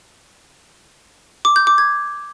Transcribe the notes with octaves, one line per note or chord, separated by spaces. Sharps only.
D6
G6
D6
G#6